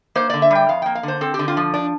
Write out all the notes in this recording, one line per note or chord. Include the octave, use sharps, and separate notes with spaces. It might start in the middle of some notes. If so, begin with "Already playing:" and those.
A#3 C5
D3 D5
E5
G3 G5
F2 F5
A#3 G5
F5
D3 C5
C4 A4
G4
D3
F4
F3
D4